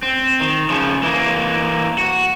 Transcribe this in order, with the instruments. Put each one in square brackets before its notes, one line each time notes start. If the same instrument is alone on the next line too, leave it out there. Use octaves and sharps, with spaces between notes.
[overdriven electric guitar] C4
D#3
C#3 F3
E3 A#3
F#4